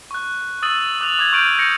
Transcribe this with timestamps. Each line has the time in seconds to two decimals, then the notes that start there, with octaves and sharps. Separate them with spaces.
0.11 C#6 F#6
0.62 D#6 E6 A6 D#7 F#7
1.01 D6 F#6 F7 F#7
1.19 D6 G#6
1.32 C#6 F6 G6 D7 D#7
1.58 G6 A#6 C#7